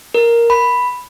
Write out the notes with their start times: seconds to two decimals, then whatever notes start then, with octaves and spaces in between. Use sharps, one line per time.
0.14 A#4
0.50 B5